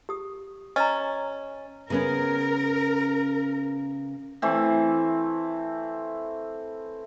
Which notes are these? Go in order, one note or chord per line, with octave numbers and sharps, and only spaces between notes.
G4 D#6
C#4 D#5 A#5
C#3 B3 C#4 A#4
E3 A3 C4